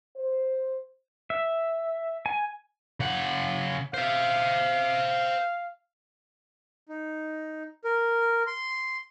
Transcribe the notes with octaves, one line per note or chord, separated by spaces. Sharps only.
C5
E5
G#5
C#3 F#5
C5 E5 F5
D#4
A#4
C6